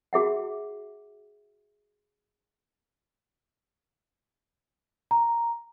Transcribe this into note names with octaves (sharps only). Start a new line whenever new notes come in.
F#4 G#4 E5 F#5
A#5